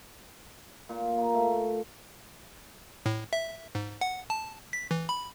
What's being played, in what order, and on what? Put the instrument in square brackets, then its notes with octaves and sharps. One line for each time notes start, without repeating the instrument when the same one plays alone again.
[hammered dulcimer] A#2
A#3
A3
[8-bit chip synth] A2
E5
G#2
F#5
A5
B6
E3
B5